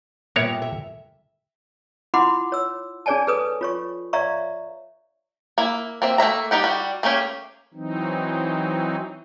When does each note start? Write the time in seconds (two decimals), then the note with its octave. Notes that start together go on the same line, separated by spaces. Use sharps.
0.36 G2 A#2 B3 A#4 C#5 E5
0.62 E5
2.14 E4 F4 F#5 B5 C6 D6
2.52 C#5 E6
3.06 D4 G#4 C#5 D5 G#5 A5
3.27 G#4 A4 B4 C#5 D#6
3.61 F4 C#5 C#6
4.13 C#5 D5 E5 F5 A#5 C#6
5.58 A#3 E4
6.02 A#3 C4 E5
6.18 A3 A#3 E5 A#5
6.51 G3 D#4 G4 F#5
6.64 G3 F#4
7.03 A3 A#3 C#4 G4 G#4
7.74 E3 F#3 C4 D#4